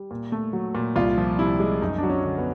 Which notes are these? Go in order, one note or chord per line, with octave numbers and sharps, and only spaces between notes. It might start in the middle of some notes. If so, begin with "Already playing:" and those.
Already playing: G3
A#2
A3
F#3
A#2
C2 F4
F3
C3 E4
G#3
F#2 D#4
F#3 D4
C#4
D3
B3